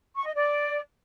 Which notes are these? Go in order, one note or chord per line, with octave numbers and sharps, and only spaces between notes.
C#6
D#5
D5